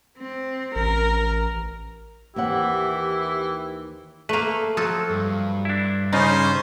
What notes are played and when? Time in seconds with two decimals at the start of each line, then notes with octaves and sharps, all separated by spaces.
0.18 C4
0.76 A1 A#4
2.36 D#2 E3 C4 E4 G4 F#5
4.29 A3 A#3 B4
4.77 F3 F#3 A4
5.10 G2
5.65 D4 E4
6.13 C#3 C#4 D#4 F4 C5